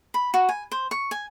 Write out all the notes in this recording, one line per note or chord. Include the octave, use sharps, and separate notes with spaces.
B5
F#4
G#5
C5
C#6
G#5